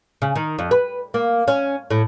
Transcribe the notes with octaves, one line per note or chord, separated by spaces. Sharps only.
C#3
D#3
F2
B4
A#3
C#4
A2